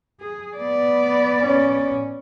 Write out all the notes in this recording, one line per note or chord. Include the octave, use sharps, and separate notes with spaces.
G#4
B3 D5
C#4